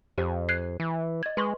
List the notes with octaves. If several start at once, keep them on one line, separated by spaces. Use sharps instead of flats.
F2 G4 C5
F#6 G#6 C7
E3
D#5 G#6
G#3 B4 C6 C#6